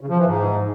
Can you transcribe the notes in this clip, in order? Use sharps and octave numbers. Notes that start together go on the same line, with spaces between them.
C#3
F3
E3
G#2